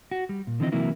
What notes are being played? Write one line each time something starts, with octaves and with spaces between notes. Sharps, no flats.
F#4
G3
A#2
D3 D#3 F3 C4 E4 D#5
C3 E3 F#3 A#3 E4